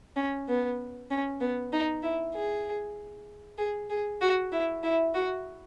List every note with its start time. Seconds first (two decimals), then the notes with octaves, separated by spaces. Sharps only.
0.16 C#4
0.49 B3
1.11 C#4
1.41 B3
1.73 D#4
2.03 E4
2.35 G#4
3.58 G#4
3.90 G#4
4.21 F#4
4.52 E4
4.83 E4
5.15 F#4